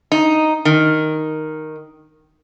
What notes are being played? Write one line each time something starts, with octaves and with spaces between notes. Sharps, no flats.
D#4
D#3